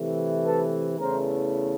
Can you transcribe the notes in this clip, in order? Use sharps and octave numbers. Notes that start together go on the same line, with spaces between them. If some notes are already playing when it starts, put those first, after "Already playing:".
Already playing: C3 E3 A3
A4 B4
E2 C#3 E3 A3 A#4 C5